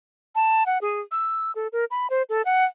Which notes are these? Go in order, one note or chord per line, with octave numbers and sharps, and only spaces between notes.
A5
F#5
G#4
E6
A4
A#4
B5
C5
A4
F#5